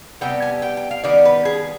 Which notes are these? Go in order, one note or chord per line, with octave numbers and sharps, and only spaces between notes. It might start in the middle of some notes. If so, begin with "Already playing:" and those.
C3 G3 B3 G5
G#5
G5
G5
F5
D#3 G3 B3 D5
B4
G#4